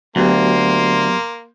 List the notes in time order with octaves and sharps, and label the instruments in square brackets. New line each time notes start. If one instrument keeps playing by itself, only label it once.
[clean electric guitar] D2 [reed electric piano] F#3 B3 G4 [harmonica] A#3 C6